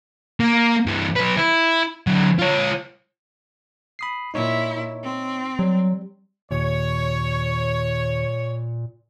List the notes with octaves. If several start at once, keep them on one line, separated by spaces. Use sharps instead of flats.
A#3
G2 E3
F#3 B4
E4
D3 F#3
F4 C#5
B5 D#6 C7
A#2 D#4 E4 C#5
C4
F#3 G3
D#2 A#2 C#5